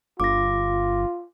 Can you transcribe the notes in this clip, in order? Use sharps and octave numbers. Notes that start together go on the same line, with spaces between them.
G1 F4 D6 A#6